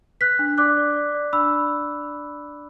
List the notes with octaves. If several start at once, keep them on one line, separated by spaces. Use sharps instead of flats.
B4 F#6 B6
D4
D5 D6 F#6
D5
D5
D5
D4 B5 E6
D5